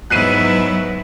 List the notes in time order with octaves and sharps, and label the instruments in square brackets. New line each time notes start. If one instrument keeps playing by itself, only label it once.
[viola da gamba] G#2 B4 [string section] F#3 [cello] B3 E4 [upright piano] F#6 C7 D#7